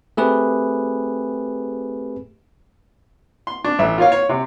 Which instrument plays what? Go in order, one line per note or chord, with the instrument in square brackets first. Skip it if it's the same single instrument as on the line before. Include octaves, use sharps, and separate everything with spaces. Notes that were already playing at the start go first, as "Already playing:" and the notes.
[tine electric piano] A3 C4 G4 G#4 B4
[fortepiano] C6
D4
A1 E5
F4 A#4 C#5 F5
C#5
C3